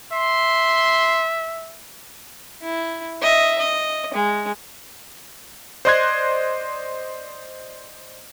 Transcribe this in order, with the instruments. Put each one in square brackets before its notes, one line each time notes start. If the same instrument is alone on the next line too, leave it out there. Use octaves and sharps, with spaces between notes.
[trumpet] E5 [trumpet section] C6
[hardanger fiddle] E4
D#5 E5
D#5
G#3
[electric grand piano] C5 D5 D#5 C6 F#6 G#6